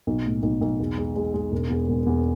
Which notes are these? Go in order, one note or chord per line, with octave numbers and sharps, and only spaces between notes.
B1
A2
B1
B1
E2
G#3
G#3
G#3
E1
E2
E1
E2